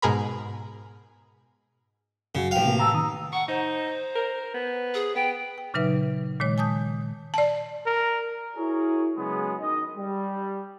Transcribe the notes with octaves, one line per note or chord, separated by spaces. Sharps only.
G#2 B2 G#4 A#4 B5
F#2 C#3 F#4
A1 F5 G5
C3 A#3
A5 A#5 E6
D#3 A#5 D#6
F#5 C#6
D#4 C5
A#4
B3
G#4
B3 G5
G5
A#2 C#3 F#3 D#4 B4 E5
A#2 D#3 G#3 C#5
G#5 A5 D#6 G6
D5 A5
A#4
E4 F#4 G#4 A#4 C#5
C#3 F#3 G#3 B3 G#4
D#3 D#5
G3